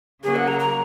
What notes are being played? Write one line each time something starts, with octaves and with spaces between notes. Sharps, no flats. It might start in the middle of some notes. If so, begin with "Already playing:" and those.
C#3 F#3 A#3 G#4
F#5
A#5
A#5